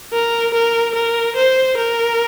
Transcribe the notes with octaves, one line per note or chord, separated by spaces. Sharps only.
A#4
A#4
A#4
C5
A#4